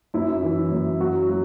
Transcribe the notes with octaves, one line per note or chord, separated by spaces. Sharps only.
F#2 E4
E3
F#2
F#3 F#4
F#3